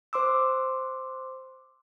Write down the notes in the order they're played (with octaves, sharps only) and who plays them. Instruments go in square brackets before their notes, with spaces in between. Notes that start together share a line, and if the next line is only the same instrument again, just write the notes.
[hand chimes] C5 C6 D6 E6